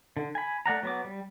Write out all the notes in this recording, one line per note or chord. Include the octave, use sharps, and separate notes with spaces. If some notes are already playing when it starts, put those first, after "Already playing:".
D3
G#5 B5
A3 D5 F#5 A#5
F#3 B3 D6
G3